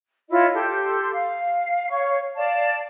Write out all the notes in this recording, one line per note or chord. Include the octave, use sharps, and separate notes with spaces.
E4 F4 C#5 D#5
G4 A4 C6
F5
C#5 F5 C#6
D5 F5 A5